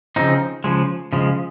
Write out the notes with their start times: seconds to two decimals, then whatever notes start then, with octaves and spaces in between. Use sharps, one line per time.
0.16 C#3 F3 C4 D#4
0.64 C#3 F3 G#3
1.13 C#3 F3 G#3